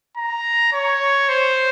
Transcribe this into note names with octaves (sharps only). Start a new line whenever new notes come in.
A#5
C#5
C5